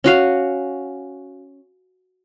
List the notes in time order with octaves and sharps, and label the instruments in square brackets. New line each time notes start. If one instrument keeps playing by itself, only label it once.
[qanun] C#4 F#4 F5